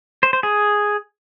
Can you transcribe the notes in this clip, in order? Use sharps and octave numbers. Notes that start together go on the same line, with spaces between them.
C5
C5
G#4